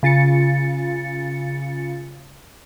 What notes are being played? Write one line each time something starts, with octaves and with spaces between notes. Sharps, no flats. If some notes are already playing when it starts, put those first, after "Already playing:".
C#3 F4 A6 C#7